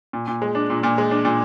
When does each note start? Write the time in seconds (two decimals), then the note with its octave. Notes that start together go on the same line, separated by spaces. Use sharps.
0.13 A#2
0.28 A#2
0.42 G#3
0.55 D4
0.70 A#2
0.83 A#2
0.98 G#3
1.11 D4
1.25 A#2